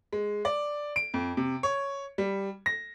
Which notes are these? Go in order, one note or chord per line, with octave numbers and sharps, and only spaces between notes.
G#3
D5
D7
F2
C3
C#5
G3
A#6